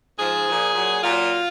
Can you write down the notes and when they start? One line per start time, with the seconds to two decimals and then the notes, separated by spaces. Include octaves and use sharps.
0.17 G#2 F3 G#4
0.47 A#2 F3
0.74 A#2 F#3
1.03 A#2 F#3 F4